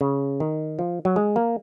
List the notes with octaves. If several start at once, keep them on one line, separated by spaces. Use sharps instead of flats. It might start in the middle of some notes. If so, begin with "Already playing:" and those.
C#3
D#3
F3
F#3
G#3
A#3